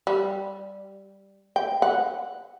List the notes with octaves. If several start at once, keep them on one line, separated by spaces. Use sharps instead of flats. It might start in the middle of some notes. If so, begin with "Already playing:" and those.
G3
G5
F#5